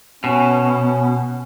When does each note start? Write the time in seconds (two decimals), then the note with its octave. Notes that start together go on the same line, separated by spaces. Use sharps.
0.24 B2 C#4